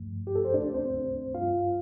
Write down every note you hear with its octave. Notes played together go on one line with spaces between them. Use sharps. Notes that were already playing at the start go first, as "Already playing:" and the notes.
Already playing: G2 F3 A3
G4
A4
C5
D2 C3 A3 D4 D5
C4 C5
G2 G3 F4 F5